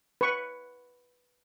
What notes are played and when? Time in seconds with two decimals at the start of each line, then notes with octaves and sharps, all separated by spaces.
0.21 B4 C#6